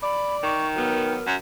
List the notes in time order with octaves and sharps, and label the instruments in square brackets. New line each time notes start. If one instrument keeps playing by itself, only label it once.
[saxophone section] D5 [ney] B5
[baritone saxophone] D#3 [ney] C#6
[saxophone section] F#3 B3 [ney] A#4
[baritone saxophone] F#2